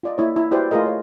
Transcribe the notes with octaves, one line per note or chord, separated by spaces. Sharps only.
F4 D5 D#5
A#3 E4 C#5
E4
E4 F#4 G4 B4 C5 D5
A3 F4 G#4 A#4 D#5
C#5